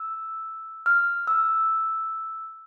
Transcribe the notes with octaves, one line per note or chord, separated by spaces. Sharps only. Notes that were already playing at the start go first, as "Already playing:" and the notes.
Already playing: E6
F6
E6